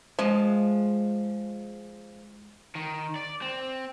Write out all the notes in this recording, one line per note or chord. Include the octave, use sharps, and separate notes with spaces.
F3 G#3 D#5
D#3
D5
C4